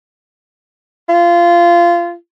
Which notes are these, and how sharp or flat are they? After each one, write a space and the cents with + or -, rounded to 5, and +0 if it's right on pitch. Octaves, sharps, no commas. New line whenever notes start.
F4 -20